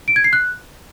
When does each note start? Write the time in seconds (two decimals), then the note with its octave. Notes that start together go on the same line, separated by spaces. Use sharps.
0.08 D7
0.16 G#6
0.24 C7
0.33 F#6